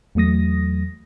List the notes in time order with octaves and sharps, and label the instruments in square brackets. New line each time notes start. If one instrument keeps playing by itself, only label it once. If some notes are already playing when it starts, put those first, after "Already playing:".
[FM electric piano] E2 F#3 A3 D#6 A#6